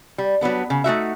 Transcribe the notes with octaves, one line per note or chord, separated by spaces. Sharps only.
G3
F#3 G3 B3 D4
C#3
A3 D#4 F#4 E5